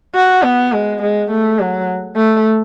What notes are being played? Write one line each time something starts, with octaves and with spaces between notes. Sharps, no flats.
F#4
B3
G#3
G#3
A3
F#3
A3